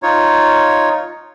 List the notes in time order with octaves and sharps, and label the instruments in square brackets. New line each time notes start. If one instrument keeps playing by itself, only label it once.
[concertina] D#4 F4 C#5